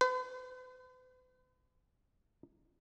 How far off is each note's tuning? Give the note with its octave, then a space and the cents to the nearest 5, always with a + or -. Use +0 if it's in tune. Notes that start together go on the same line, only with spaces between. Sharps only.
B4 +45